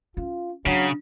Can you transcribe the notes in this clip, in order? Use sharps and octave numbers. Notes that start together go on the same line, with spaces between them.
C#4 F4
C#3 F#3 D4